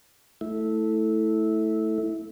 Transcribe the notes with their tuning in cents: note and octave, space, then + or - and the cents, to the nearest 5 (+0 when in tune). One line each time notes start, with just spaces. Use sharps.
A3 +0 E4 -15